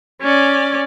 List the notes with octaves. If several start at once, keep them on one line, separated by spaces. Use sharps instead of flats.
C#4 D5